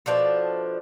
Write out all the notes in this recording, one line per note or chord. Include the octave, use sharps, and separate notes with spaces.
B2 F3 D4 A4